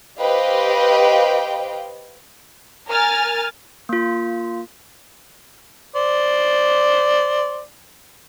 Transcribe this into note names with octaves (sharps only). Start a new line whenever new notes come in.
G4 B4 C5 D#5 F5 G5
A#4 G#5 F6 A6
A#3 F4
C5 D5